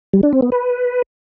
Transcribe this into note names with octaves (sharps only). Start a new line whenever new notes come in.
G3
D4
C4
B3
B4